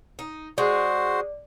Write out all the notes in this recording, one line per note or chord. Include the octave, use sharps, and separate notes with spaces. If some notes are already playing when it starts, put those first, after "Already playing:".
D#4
G#3 F#4 C5 D5